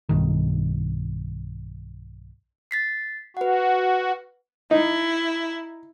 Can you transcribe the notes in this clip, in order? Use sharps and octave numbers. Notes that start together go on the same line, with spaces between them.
B1 G2 D#3
A6 B6 C7
F#4 B4 F#5
D#4 E4